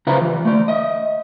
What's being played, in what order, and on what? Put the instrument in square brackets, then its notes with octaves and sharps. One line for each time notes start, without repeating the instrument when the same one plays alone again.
[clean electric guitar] C#3 F4 B4 C5 E5 A#5
E3 G3
A3 D5
D#5 E5